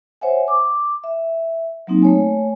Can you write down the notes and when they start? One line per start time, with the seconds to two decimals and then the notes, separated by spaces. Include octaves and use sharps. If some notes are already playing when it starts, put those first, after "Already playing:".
0.21 C5 C#5 E5 F#5 G#5
0.48 D6
1.04 E5
1.87 F#3 A#3 C4 D#4
2.02 A3 C#5 G#5